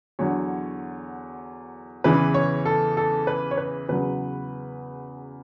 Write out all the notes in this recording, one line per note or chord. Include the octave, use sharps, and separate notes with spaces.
E2 D3 F#3 C#5
E2 C#3 E3 B4
C#5
A4
A4
B4
C#5
B4
E2 C#3 F#3 B4